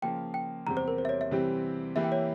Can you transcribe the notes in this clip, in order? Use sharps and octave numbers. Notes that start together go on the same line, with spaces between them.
C#3 F3 A#3 F4 G5
G5
E2 C3 G3 C4 G4 A#5
C5
A#4
C5
E5
C#5
E5
C3 E3 G3 C4 G4
E3 A#3 E4 G4 E5
G5
C#5